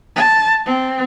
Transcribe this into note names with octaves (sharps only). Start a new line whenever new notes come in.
A5
C4